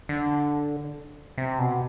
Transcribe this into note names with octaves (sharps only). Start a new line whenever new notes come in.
D3
C3
B2